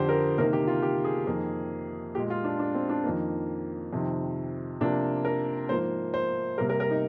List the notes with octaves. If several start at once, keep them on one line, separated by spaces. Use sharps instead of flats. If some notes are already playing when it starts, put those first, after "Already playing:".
Already playing: F2 D3 F3 D4 G4 C5
A#4
C3 D#3 A#3 A#4
G4
F4
G4
G#4
F2 D#3 A#3
A#2 G#3 G4
F4
D4
D4
C4
D4
F2 D#3 A#3
F2 C3 D#3
C3 F3 A#3 D4
A#4
G#2 F3 A#3 C5
C5
C3 G3 A#3 A#4
A#4
A#4
D#4